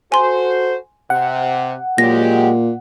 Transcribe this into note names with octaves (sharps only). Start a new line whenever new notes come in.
F#4 A4 C5 G#5 C6
C3 F#5
A#2 F#3 G#3 G4 A#6